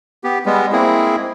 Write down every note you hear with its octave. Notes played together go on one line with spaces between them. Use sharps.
B3 G4
G3 G#3 B3
G#3 A#3 C4 E4 G#4